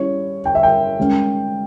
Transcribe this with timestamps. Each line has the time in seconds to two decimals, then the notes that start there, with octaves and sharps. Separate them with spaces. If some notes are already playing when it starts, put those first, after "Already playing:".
Already playing: G3 C#4 E4 C#5
0.45 G5
0.55 E5
0.63 G5
0.98 D#3 G#3 C#4